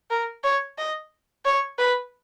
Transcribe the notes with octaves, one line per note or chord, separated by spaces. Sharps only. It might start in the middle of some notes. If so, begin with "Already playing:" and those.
A#4
C#5
D#5
C#5
B4